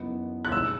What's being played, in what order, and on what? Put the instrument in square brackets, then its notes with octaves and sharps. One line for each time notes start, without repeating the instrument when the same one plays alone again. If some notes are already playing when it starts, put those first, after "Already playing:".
Already playing: [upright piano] F#1 F#2 E3 B3 D#4
[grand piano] F#6
[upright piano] G#2 E3 G#3 [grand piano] E6